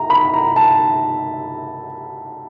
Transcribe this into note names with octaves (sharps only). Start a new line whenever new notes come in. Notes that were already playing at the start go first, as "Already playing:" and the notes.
Already playing: A#5
B5
A#5
A5